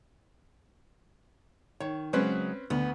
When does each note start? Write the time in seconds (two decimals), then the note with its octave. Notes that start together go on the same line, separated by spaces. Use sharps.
1.80 D#3 C#5
2.13 C#3 F#3 G#3 C4 C#4 B4
2.70 D2 B3